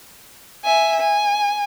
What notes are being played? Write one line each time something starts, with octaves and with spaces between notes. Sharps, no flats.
E5 G#5
G#5